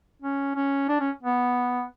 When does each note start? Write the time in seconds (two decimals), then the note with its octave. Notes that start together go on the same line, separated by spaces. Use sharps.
0.22 C#4
0.55 C#4
0.88 D4
1.00 C#4
1.23 B3